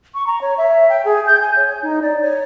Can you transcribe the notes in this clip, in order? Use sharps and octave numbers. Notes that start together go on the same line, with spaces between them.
C#6
A#5
C#5
E5
G5
G#4
G6
G#5
C#5
D#4
D5
C#5